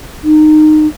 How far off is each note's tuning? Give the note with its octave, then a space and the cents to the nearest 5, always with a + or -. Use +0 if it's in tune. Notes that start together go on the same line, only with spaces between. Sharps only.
D#4 -20